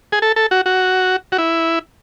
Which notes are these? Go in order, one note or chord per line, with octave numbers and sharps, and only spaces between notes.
G#4
A4
A4
F#4
F#4
F#4
E4